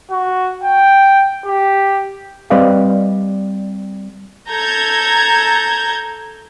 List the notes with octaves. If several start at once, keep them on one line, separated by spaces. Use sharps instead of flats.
F#4
G5
G4
G3 C4 B4 D5 D#5 F5
A4 A#5 G6 G#6